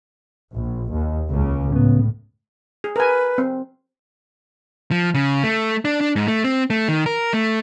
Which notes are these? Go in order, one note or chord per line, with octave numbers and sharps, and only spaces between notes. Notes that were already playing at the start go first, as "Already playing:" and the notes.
A#1
D#2
C#2 C#3
A2 C#3 B3
G#4
A#4 B4 G#5
C4
F3
C#3
A3
D4
D4
G#2
A3
C4
A3
D#3
A#4
A3